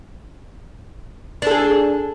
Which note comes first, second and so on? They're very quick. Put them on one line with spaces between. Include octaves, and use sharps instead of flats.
D4 A4 G#4